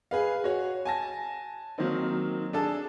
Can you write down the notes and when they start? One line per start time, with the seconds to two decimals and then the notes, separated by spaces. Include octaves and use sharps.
0.11 G#4 B4 F5
0.44 F#4 C#5
0.85 G#5 A5 A#6
1.78 D#3 F#3 A#3 C4 D#4
2.53 D4 G#4 A4 A5